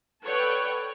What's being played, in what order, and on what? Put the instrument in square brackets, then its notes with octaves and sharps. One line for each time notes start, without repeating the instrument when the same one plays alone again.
[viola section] A4 B4 C#5 D5 F#5 G5